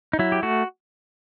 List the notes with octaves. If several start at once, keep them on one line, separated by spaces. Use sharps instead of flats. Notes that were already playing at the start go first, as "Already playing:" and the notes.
D#4
F#3 E4
G4
A3 F#4